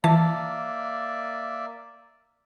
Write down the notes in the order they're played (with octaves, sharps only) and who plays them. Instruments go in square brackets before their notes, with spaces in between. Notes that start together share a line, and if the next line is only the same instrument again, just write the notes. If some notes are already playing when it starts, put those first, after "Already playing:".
[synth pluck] E3 A5 [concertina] A#3 D5 E5